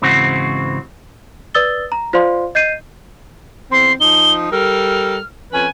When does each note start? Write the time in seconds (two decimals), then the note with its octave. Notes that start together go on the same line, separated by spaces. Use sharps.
0.02 G#2 C#3 E3 C4 F#4
1.54 B4 D5 D#6 E6 A6 G7
1.92 A#5
2.13 F4 C5 D5 F5 C6
2.55 D#5 G6 C7 D#7
3.71 E2 C4 C6
4.00 F3 D#4 G7
4.52 G3 A4 A#4 F6
5.53 F2 C#4 B4 G#5